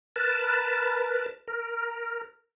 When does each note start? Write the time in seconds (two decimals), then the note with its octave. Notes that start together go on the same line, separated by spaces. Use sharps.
0.16 A#4 B4 A5
1.48 A#4